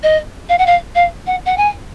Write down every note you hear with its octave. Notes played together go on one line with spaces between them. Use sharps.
D#5
F5
F#5
F5
F5
F#5
F#5
G#5